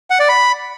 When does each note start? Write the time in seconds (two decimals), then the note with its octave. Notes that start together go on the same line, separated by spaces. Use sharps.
0.10 F#5
0.20 D5
0.29 B5